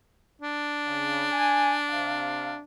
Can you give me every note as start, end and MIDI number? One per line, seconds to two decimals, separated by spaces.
0.42 2.64 62
0.87 1.27 49
1.32 1.75 80
1.90 2.56 48
1.90 2.56 77